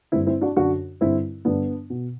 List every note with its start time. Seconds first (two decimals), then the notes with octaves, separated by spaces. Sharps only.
0.12 D3 C4 E4
0.15 G2
0.27 C4 E4
0.41 D4 F#4
0.56 F#2 D3 D4 F#4
1.01 G2 D3 C4 E4
1.45 G2 D3 B3 D4
1.90 B2